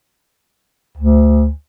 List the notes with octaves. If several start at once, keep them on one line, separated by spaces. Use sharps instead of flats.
D2